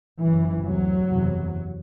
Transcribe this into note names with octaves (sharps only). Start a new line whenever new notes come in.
F#1 F#2 E3
D2 C3 F#3
F#1 E2 C3